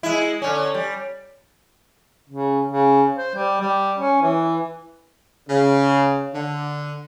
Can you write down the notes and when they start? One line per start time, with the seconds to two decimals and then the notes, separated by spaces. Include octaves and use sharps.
0.03 G#3 E4
0.42 D3 C#4
0.74 G3
2.29 C#3
2.68 C#3
3.15 C5
3.36 G3
3.60 G3
3.98 C#4
4.22 E3
5.48 C#3
6.34 D3